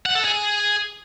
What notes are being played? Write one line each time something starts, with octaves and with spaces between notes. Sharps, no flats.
F#5
A4
G#4